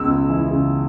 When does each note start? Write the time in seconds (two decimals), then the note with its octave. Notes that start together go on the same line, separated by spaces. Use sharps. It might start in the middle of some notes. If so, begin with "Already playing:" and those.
Already playing: C#2 B2 E6
0.12 C#2
0.29 E3
0.47 C#3